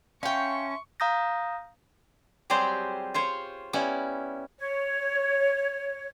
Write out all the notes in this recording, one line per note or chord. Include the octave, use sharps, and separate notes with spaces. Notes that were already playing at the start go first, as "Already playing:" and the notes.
C#4 E5 F5 G5 A5 C6 C#6
F5 A#5 D#6 G6 A#6
F#3 G3 C4 G4 G#4 C5
F4 C5 C#5
G3 B3 C#4 E4
C#5